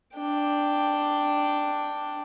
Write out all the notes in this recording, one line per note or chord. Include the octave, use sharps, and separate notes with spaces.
D4 G5